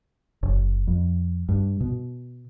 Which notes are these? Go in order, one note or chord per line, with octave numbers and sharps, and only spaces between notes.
F#1
F2
G2
B2